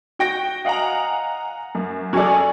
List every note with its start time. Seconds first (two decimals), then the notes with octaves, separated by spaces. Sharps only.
0.19 F#4 G5 A#6 D7
0.65 D#5 F5 F#5 G#5 A#5
1.75 F#2
2.13 F#3 C#4 F#4 G#4 A4 D5